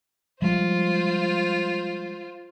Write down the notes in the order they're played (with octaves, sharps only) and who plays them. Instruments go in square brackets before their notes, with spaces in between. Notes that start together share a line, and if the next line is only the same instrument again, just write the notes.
[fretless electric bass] F3 G3 G#3 [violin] F4 C5